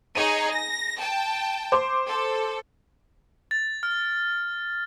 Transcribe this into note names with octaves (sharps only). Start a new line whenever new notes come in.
D#4 G#4 C#5 D#7
A#6
G5 A5
C5 C6 D6
A4
A6
F6